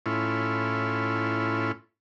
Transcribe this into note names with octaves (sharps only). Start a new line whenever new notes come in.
A2 C#4 E4 F4